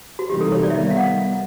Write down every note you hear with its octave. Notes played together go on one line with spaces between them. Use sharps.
F#4
C3 E3 G3 A#3 D#4 G4
A4
C#5
D5
E5
D#3 G3 B3 D#5
F5
F#5